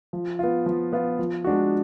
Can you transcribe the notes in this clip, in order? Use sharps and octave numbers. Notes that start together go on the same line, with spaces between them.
F3
B3 F4
F3
B3 F4
F3
G#3 D4 F#4